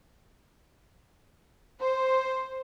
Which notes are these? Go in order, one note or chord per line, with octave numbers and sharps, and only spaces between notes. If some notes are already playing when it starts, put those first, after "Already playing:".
C5